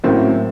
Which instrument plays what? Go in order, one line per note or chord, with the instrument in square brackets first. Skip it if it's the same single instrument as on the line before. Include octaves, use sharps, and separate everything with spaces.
[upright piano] A1 A2 F#3 A#3 C#4 [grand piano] C4